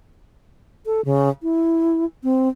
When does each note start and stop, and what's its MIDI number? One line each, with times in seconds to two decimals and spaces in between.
0.86 1.01 69
1.05 1.29 49
1.43 2.05 64
2.24 2.49 60